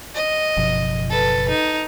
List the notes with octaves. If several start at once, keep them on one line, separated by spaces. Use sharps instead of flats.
D#5
F#1 B2 F3
A4 B4
D#4